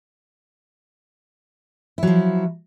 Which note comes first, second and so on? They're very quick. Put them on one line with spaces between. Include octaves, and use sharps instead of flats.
E4 F#3 F3